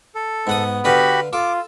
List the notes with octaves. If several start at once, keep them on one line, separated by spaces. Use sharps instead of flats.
A4
G#2 B3 F#5 D#6
D3 F#4 G4 B4 F5 B5
F4 A4 D6